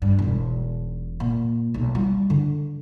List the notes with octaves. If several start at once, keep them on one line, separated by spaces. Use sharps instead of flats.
G2
E1 B1
A#2
B1
G3 E4
D3